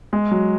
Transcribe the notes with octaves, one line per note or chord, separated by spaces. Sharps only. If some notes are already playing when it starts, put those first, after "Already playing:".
G#3
F#3